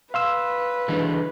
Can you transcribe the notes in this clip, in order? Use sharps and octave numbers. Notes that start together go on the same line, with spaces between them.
B4 F5 C6 E6
D3 E3 G#3